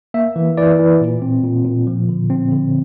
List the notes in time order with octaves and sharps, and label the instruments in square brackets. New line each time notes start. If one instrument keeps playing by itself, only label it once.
[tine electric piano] A#3 E5
E3
E3 D5
E3
A#2
C4
A#2
A#2
F3
D3
C4
D3